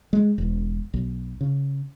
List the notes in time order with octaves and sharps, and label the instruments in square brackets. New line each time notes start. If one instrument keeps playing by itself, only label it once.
[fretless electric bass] G#3
E1
B1
C#3